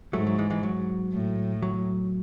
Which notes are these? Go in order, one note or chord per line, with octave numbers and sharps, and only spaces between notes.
G#2 F#3 A3
F#3
E3 G#3
E3 G#3
F#3
A2
F#3